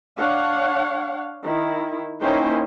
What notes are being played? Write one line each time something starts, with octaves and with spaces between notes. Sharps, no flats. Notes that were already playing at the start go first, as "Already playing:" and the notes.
D4 C#5 F5 F#5
D#3 E4
A#3 C#4 D#4 E4 C5 G5